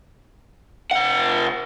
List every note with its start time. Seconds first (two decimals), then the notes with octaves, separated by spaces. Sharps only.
0.91 C3 F#5